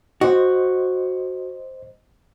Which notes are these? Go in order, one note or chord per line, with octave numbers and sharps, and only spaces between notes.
F#4 C5 D#5